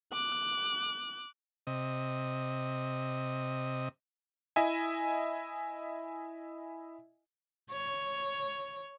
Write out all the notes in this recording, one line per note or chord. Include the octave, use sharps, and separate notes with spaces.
D6 F#6
C3 D#5
E4 D#5 E5 G#5
C#5